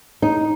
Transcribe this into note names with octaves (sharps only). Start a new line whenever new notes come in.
D#4